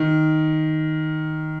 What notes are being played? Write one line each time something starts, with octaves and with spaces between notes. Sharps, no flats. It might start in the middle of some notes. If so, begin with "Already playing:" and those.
Already playing: D#3